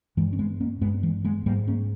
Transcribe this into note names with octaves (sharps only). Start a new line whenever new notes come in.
G2 E3 G#3
C#4
G#3 B3
A#3 C#4
G2 G#3 B3
E3 G#3
G#3 B3
G#2 G3 A#3
A#3 C#4